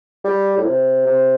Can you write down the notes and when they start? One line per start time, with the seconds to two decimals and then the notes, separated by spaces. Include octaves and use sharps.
0.24 G3
0.57 A2
0.66 C3
1.06 C3